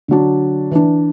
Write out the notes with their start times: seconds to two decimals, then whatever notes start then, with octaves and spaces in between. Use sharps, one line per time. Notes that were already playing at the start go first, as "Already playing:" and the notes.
0.08 D3 F#3 D4
0.71 E3 D4